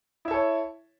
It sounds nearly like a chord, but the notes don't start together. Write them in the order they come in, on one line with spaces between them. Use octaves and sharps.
E4 E5 A4 C#5